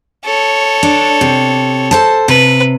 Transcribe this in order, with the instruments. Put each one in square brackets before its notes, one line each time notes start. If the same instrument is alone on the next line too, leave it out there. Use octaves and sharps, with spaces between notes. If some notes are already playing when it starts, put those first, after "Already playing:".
[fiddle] A4 C#5
[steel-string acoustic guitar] D4
C3
A4 C5 A5
[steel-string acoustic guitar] C3 [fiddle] B4